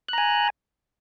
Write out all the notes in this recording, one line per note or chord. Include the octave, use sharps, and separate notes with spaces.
G#5 A#5 F#6